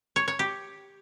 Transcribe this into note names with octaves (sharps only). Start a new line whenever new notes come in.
C#5
C#5
G4